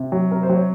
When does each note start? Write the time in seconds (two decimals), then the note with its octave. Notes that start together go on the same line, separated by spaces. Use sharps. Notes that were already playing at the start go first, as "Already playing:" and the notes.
Already playing: C3
0.12 F#3
0.31 C3 A#4
0.43 C5
0.49 F#3
0.56 C#5